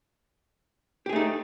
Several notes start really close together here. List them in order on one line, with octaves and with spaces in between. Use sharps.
G4 G#4 A3 D#4